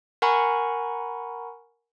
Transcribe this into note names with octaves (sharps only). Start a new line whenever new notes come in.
A#4 F#5 G#5 A#5 B5 C#6